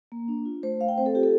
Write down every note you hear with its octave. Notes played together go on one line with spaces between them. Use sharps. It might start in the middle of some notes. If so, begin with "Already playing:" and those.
A#3
D4
F4
A3 C5
A3 F5
G5
C4 C5
A4
F4 G4
A4